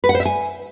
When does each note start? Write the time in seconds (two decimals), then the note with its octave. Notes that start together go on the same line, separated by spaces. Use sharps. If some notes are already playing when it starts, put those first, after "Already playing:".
0.04 B4
0.09 F#5
0.15 C5
0.20 E5
0.25 G#5